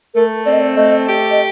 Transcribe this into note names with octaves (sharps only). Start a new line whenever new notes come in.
A3 A#4
C4 D5
D#5
D5
A3 D#5
G4
D#5